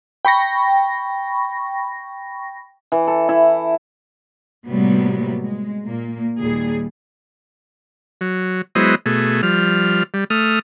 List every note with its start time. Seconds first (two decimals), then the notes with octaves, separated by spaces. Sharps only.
0.25 G5 B5 C#6 A#6
2.92 E3
3.07 A4
3.29 E4
4.66 A2 C3 F#3 G3 A#3 B3
5.42 G#3
5.85 A#2 A#3
6.40 D#2 A#2 G3 G#4
8.21 F#3
8.75 F#3 G#3 B3 E4 C5 D#5
9.06 B2 A3 G#4
9.43 F3 G3 F6
10.14 G3
10.30 A3 D#6 F6